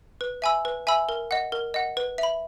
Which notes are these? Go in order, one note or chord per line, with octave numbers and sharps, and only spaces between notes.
B4
E5 G#5 B5 E6
B4
E5 G#5 B5 E6
A#4
D#5 F#5
A#4
D#5 F#5
B4
E5
B5